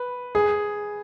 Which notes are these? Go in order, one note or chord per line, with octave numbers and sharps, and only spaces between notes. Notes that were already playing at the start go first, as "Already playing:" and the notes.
Already playing: B4
G#4